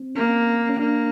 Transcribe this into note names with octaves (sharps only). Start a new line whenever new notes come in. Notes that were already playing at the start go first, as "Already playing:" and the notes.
Already playing: C4
A#3 C#4
C#4
A#3 D4